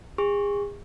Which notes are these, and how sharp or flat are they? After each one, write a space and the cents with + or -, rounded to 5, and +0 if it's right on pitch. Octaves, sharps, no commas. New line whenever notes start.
G#4 -35 C#6 -35